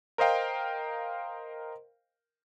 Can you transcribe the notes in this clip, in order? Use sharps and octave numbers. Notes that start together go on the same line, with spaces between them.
A#4 C5 D#5 F5 G5